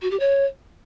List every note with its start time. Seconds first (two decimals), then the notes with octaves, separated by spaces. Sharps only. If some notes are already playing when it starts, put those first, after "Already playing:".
0.01 F#4
0.10 G4
0.19 C#5